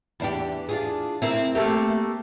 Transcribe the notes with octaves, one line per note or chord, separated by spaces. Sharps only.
E2 D4 G4
D4 F4 G#4
C4 E4 A#4
A3 A#3 G4